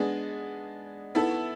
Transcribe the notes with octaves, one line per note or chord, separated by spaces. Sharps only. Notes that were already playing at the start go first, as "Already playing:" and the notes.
Already playing: G#3 B3 D4 G#4
B3 E4 A4